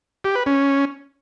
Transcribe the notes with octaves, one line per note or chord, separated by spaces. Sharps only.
G4
B4
C#4